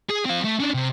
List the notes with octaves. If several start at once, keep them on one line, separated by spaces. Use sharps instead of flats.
G#4
C4 F5
A3
C#4 D4
C3